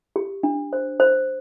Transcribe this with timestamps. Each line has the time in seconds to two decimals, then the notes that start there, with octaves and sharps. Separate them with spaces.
0.16 G4
0.43 D4
0.73 C5
1.00 C5